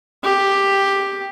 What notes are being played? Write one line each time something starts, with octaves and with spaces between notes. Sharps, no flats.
G4